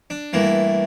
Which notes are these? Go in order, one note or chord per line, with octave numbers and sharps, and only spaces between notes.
D4
G2 E3 A3 A#3